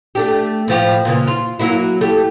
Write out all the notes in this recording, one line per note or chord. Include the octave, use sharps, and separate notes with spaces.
A3 D4 G4
A2 F3 G4
A#2 C#3 E3
F4
F#3 A#3 E4
A3 G4